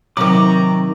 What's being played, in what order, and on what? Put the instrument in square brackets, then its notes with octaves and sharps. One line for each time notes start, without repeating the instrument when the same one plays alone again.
[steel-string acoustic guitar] C3 D#3 [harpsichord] F#3 [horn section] C4 A#5 [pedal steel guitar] D6